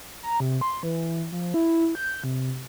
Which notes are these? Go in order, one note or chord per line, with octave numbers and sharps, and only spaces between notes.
A#5
C3
C6
E3
F3
E4
G6
C3